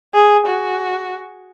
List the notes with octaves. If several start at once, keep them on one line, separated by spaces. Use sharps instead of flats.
G#4
F#4